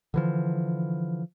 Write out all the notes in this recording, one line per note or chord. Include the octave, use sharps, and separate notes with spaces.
D3 E3 F3